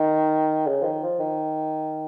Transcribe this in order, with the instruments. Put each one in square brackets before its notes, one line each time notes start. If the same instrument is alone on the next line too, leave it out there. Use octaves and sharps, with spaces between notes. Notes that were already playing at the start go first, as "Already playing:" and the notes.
Already playing: [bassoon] D#3
C#3
F3
D#3
F3
D#3